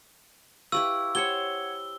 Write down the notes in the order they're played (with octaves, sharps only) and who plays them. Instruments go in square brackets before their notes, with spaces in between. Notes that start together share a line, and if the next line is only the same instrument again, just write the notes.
[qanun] E4 G4 B4 [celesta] F5 C#6 [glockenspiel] E6
[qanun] G4 C5 C#5 [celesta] F#5 G#6 C#7 [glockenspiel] G7